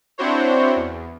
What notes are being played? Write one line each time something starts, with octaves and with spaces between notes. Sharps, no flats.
C4 D4 E4 F#4 C5 C#5
E2